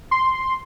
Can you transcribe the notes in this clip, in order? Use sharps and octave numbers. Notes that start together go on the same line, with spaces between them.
C6